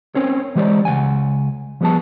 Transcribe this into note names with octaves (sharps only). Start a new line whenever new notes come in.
C4 C#4 A#4 C5 C#5
E3 G#3 G4 C5 D5
C#2 D#3 F#5 G#5
F3 G3 B3 G#4 A5